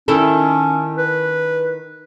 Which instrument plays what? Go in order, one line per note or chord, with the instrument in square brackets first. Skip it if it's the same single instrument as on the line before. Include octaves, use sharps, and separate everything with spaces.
[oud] D#3 E4 A4 [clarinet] C#4
[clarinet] B4